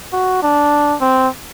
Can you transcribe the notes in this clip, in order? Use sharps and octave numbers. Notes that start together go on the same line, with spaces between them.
F#4
D4
C4